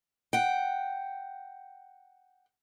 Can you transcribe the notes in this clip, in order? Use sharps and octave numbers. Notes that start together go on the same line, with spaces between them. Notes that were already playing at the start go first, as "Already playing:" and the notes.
F#5 G5